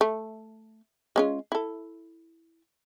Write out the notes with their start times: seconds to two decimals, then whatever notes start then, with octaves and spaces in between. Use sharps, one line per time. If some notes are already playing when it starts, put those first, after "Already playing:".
0.01 A3
1.16 G#3 C#4 F4
1.52 E4 A4